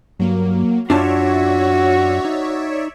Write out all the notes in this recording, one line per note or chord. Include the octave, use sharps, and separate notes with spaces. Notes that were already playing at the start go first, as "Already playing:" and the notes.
G2 F#3 A#3
F#2 D4 F4 F#4 C#5 D5 E5 A5
D#4